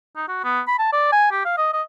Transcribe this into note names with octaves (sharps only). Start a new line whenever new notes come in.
D#4
F#4
B3
B5
A5
D5
G#5
G4
F5
D#5
D#5